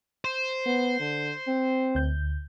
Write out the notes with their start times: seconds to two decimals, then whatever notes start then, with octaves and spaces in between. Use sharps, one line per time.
0.25 C5
0.66 B3
1.00 D3
1.48 C4
1.95 D2 G6